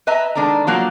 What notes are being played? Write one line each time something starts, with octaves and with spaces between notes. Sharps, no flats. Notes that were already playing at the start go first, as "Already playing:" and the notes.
B4 D#5 E5 G#5 A#5
D#3 G#3 D4 A4 A#5
F3 F#3 A#3 F4